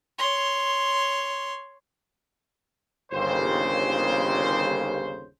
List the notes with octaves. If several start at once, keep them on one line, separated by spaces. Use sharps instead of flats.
C#5 C6
G1 D#2 C#3 C5